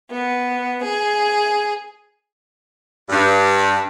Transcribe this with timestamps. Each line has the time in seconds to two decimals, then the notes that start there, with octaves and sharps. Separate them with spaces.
0.11 B3
0.84 G#4
3.09 G2